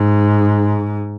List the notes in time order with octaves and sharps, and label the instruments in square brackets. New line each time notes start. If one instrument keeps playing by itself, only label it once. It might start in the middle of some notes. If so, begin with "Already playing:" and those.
Already playing: [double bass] G#2